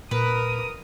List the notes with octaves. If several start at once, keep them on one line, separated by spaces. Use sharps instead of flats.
A#2 A#4 B4 D#6